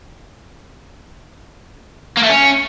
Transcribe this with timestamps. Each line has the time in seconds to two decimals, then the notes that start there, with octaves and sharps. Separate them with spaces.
2.17 A#3
2.23 A3
2.29 C#4